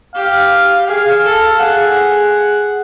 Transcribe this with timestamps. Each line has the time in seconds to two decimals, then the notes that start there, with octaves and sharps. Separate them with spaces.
0.15 G4 F5
0.87 G#4 F5
1.24 A4
1.59 G#4 F#5